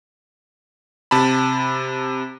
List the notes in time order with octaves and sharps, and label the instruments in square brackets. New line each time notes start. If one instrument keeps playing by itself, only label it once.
[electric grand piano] C3 A5 B5